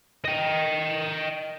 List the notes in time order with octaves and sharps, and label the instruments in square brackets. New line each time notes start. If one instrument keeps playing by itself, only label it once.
[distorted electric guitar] D#5 G5